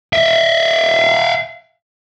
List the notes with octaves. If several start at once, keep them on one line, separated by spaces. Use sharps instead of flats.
E5 F5